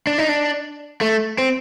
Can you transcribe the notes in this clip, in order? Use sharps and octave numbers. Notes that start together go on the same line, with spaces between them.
D4
D#4
D4
A3
C4